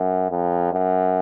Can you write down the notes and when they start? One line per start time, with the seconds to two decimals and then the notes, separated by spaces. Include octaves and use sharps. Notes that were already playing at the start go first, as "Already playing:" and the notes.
Already playing: F#2
0.30 F2
0.72 F#2